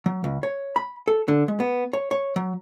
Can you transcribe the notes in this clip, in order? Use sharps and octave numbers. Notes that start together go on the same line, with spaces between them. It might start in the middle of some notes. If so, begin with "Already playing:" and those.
F#3
C#2
C#5
B5
A4
D3
G#3
B3
C#5
C#5
F#3